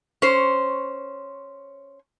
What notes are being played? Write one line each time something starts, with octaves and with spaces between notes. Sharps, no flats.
C#4 C5